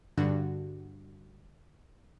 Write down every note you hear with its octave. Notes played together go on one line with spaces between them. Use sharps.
G2 D3 F#4